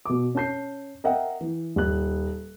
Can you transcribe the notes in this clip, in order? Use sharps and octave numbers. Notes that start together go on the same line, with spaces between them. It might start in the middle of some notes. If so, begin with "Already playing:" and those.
B2 D6
C#4 A5 G6 C7
A#4 D#5 E5 F#5 G5
E3
D#1 F#6